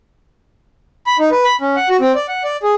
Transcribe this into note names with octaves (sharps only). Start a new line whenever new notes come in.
B5
D#4
B4
B5
C#4
F#5
F#4
C4
D5
F#5
D5
G#4